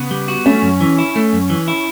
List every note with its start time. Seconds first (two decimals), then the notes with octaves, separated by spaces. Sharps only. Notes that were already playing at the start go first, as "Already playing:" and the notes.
Already playing: C#3 B3
0.11 G3
0.28 F#4
0.46 A3 C#4
0.62 F#2
0.80 E3
0.98 E4
1.16 A3
1.33 F#2
1.50 E3
1.68 E4